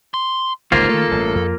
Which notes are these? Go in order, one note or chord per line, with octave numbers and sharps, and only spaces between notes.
C6
G1 C#2 A#3 D#4 F4 C5
D#3 A3 A4
A1 G2
F2